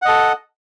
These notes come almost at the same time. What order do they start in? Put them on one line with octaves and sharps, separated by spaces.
F#5 D#5 A4